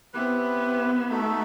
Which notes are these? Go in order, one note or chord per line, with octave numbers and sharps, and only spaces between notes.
B3 C4 E4 G4 B4
A3 D#4 F#4 A4 E5